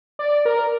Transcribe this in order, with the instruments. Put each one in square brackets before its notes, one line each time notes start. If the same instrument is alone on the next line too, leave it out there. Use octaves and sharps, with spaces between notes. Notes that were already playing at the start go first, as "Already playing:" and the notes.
[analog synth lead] D5
A#4